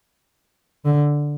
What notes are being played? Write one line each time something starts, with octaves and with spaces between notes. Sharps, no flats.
D3